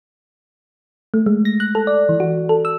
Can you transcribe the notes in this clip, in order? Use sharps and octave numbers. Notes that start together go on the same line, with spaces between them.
A3
G#3
A#6
F#6
A4
D5
E3
F#4
A4
E6